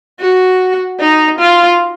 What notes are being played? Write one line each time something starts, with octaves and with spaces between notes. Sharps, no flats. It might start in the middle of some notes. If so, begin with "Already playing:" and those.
F#4
D#4
F4